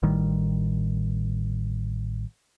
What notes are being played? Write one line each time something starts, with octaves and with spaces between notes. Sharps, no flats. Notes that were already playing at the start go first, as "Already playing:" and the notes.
A1 A2 D#3 G3